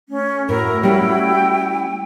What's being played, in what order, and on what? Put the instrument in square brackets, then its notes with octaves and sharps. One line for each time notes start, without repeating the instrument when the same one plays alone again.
[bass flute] A3 [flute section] C#4
[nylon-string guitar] A2 [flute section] E4 F#4 [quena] A#4
[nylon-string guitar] G3 C#4 [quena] G5